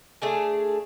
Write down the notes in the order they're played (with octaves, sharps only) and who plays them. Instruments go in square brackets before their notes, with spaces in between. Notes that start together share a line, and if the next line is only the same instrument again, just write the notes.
[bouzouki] A3 D4 G#4